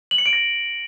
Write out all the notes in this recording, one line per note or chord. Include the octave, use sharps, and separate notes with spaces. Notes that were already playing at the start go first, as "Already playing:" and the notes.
F#7
C#7
D7
A#6